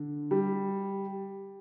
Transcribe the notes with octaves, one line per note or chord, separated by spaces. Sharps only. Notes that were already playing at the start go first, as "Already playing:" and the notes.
Already playing: D3
G3